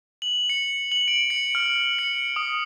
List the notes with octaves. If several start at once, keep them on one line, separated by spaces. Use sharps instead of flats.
F#7
C#7
F#7
D7
C#7
F6
C#7
D#6